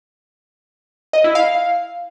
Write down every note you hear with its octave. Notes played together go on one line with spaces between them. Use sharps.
D#5
E4
F5